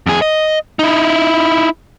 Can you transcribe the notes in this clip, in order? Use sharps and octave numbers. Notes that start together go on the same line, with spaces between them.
F2 G#4
D#5
D#4 E4